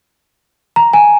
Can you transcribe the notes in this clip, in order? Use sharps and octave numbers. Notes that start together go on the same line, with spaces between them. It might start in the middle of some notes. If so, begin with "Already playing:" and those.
A#5
G#5